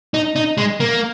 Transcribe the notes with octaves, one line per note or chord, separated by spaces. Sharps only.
D#4
D#4
G#3
A#3